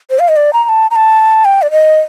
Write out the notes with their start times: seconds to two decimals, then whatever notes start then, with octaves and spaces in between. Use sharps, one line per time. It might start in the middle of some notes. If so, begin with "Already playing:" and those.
0.10 C5
0.19 F5
0.29 D#5
0.36 D5
0.53 A#5
0.64 A#5
0.69 A5
0.91 A#5
0.96 A5
1.45 G5
1.62 D5
1.71 D#5